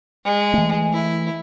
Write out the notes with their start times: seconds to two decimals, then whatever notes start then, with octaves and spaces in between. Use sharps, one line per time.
0.24 G#3
0.54 E3 A3
0.93 E4